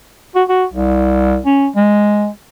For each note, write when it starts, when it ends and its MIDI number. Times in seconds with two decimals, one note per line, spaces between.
0.35 0.44 66
0.49 0.65 66
0.74 1.39 36
1.46 1.69 61
1.76 2.28 56